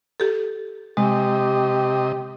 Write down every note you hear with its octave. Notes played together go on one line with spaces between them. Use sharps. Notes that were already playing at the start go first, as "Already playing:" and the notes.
G4 A4
C3 G#3 G4 D#5